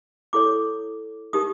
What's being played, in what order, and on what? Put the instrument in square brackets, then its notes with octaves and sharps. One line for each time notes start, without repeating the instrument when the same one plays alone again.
[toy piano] E4 A4 C#5 D6
D#4 G4 A#4 D#6